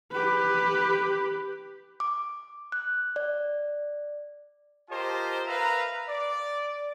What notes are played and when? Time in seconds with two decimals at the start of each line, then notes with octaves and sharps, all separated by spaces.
0.12 G4 B4
2.00 D6
2.72 F#6
3.16 D5
4.90 F4 G4 A#4 C5 D#5 A5
5.47 A#4 B4 E5 F5 A#5
6.08 D5